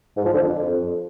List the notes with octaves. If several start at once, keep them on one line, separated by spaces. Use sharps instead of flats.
G#2
F3
D3
F2